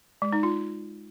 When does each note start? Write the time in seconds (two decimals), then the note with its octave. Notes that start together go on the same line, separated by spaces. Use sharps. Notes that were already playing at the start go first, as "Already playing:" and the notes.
0.22 G#3
0.33 D#4
0.43 F4